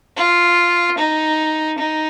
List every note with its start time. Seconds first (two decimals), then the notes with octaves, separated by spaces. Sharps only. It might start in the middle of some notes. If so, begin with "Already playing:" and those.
0.17 F4
0.98 D#4
1.78 D#4